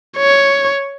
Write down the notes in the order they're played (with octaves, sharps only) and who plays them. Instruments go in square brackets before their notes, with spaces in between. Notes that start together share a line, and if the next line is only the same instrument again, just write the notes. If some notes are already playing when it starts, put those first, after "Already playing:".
[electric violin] C#5